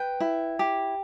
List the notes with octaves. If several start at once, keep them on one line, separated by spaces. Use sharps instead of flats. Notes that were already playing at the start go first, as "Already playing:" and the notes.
Already playing: B4 G5
E4
G4